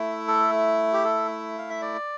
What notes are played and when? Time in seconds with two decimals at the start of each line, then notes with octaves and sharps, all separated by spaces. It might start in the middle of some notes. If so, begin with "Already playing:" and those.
Already playing: A3 E4
0.28 A4
0.93 G4
1.04 A4
1.58 F5
1.69 E5
1.81 D5